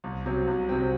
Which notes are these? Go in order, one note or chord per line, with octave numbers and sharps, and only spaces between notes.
C2
C3 F#3 C4
C2
C3 F#3 C4